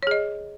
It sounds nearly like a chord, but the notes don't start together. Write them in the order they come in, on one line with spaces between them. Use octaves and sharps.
C#5 G#4 D#5